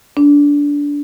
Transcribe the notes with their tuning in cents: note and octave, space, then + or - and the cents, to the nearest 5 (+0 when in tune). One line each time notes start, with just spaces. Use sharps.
D4 -20